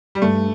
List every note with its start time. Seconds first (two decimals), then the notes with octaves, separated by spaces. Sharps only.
0.15 G3
0.22 G2 A3